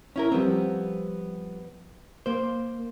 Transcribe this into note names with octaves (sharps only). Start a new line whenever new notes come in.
C#4 E4 A#4
F3 G3 B3 C4
A#3 C5